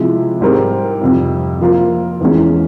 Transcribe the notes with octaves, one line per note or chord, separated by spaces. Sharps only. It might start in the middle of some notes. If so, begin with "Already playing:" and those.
Already playing: C3 F3 G#3 E4
G#2 G3 C4 G4 A#4
F2 C3 G3
F3 A#3 F4 A#4
E2 E3 G#3 C#4